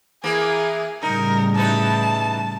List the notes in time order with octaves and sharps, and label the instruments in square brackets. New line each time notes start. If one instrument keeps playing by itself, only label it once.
[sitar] E3 A#3 [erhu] G#4
[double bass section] A2 C#3 G3 [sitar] D#4 [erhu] A#4
[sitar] E3 D#4 B4 [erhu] A5